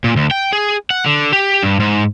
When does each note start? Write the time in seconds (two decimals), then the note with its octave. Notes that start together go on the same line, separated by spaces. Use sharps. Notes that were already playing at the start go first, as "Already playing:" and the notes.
0.04 A#2
0.16 D2
0.31 G5
0.53 G#4
0.90 F#5
1.06 D3
1.33 G4
1.63 G2
1.80 G#2